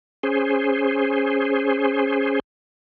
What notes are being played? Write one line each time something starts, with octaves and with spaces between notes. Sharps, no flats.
C#4 G#4 C5